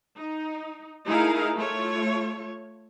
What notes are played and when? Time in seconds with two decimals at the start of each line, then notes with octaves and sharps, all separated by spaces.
0.18 D#4
1.06 A3 D#4 E4 G#4 A#4 F5
1.55 A3 F4 C#5